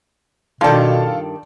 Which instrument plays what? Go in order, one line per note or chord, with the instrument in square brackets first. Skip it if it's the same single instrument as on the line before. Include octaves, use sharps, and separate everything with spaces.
[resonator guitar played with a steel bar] G2 D#3 [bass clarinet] B2 [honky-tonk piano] F4 A4 [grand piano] D5 A5 C6